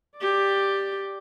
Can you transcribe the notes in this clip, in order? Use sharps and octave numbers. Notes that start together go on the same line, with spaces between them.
G4 D5